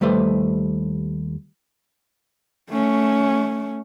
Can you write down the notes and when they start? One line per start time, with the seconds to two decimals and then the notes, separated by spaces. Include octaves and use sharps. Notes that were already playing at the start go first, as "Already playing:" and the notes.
0.01 D#2 G3 A3 B4 C5
2.70 A3 C#4